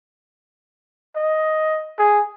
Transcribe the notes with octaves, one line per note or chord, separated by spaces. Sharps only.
D#5
G#4